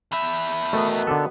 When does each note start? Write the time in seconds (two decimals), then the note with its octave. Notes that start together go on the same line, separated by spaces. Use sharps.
0.12 E2 E5 B5
0.73 B2 D#3 A3 B3
1.07 D3 D4 A4